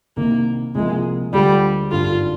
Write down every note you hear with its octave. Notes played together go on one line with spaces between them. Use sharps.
C2 C3 D#3 A#3
C2 C3 F3 G#3 A#3
D2 D3 G3 G#3 D4 F4
G#1 G2 D3 F4